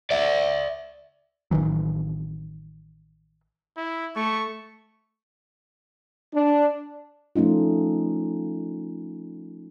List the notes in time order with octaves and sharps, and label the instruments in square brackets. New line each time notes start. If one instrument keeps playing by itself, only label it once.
[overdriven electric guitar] D5 E5
[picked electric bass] A1 D#3 E3 F#3
[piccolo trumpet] E4
[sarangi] A3 [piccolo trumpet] C#6
[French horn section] D4
[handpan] F3 A3 C#4 D#4 F4